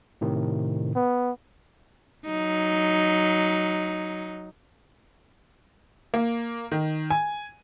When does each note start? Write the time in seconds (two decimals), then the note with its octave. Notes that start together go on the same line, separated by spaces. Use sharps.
0.21 A2 C3 D#3
0.96 B3
2.26 F#3 D#4
6.14 A#3
6.72 D#3
7.10 G#5